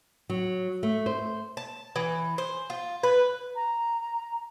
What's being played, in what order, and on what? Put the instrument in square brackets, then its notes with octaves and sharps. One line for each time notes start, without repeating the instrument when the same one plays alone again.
[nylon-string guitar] F#3
A3
C5
[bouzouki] A5
E3
C5
F4
B4
[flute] A#5